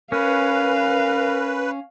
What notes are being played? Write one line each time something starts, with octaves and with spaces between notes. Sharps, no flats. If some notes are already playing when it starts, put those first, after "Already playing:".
C#4 A#4 B4 F5